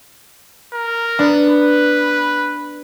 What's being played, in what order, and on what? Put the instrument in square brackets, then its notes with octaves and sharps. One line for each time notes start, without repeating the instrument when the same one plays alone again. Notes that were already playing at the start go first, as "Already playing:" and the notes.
[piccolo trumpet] A#4
[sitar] B3 [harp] D4
[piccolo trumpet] B4